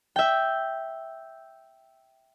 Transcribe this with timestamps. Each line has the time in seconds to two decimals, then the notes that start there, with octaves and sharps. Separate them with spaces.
0.16 E5 G5